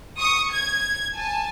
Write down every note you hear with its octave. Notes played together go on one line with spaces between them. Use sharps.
C#6 D#6
G#6
G#5 A5